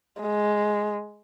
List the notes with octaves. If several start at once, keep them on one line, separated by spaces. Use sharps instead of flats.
G#3